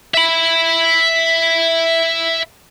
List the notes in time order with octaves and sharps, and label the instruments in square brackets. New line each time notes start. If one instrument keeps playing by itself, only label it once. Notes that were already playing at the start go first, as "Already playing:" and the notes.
[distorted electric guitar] E5 B5